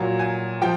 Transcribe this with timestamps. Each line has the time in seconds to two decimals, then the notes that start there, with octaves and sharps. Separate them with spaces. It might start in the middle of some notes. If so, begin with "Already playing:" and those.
Already playing: A#2 F#3
0.19 G#5
0.62 F3 G5